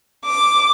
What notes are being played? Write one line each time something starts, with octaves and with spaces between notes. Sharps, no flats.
D6